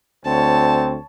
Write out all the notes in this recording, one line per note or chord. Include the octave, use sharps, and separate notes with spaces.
D2 C4 C#5 A5